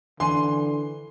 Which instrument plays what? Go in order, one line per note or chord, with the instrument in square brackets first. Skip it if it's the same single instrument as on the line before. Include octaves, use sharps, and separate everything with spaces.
[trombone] D3 [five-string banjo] E3 G#5 [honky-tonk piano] C6